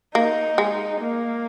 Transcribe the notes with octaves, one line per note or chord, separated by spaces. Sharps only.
A#3 D#4
G#3
A#3